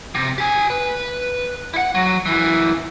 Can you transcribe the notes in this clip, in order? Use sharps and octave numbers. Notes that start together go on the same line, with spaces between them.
C3
G4 G#5
B4
E4 F#5
F#3
F#2 E3